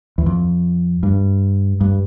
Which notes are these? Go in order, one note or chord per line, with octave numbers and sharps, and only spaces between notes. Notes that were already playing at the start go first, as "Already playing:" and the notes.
E2
F2
G2
G2